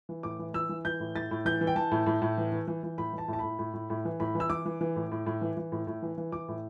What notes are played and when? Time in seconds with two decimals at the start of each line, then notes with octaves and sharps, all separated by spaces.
0.09 E3
0.23 A2 D6
0.39 E3
0.54 E3 E6
0.69 E3
0.85 E3 G6
1.00 A2
1.15 A2 A6
1.31 A2
1.45 E3 G6
1.61 E3
1.67 G5
1.76 E3 A5
1.91 A2
2.06 A2
2.22 A2
2.38 E3
2.52 E3
2.67 E3
2.83 E3
2.98 A2 B5
3.13 E3
3.18 A5
3.28 A2
3.33 A5
3.39 A2 B5
3.59 A2
3.73 A2
3.90 A2
4.05 E3
4.20 A2 B5
4.35 E3
4.40 E6
4.50 E3 D6
4.66 E3
4.81 E3
4.96 A2
5.12 A2
5.26 A2
5.41 E3
5.57 E3
5.72 A2
5.87 A2
6.02 E3
6.18 E3
6.32 E3 D6
6.48 A2